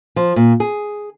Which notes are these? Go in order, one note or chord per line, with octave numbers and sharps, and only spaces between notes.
F3
A#2
G#4